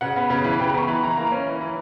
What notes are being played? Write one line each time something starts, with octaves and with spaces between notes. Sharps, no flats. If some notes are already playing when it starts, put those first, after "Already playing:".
C#3 F#5
B3
C#3
E3
C#3 G5
A#5
B3 C#6
E3 B5
E3 A#5
A#3 A#5
C#4
E3
E3